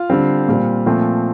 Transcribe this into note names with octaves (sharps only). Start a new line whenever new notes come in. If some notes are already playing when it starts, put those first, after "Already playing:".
Already playing: F4 F5
D3 G3 C4
A#2 G3 C4
A#2 F3 A3 C4